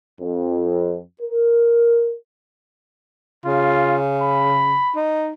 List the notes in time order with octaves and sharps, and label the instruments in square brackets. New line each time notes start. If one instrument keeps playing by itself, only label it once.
[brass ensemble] F2
A#4
[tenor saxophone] C#3 [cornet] F4
[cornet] B5
[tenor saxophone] D#4